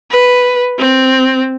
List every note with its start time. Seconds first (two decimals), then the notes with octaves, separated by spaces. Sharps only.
0.11 B4
0.78 C4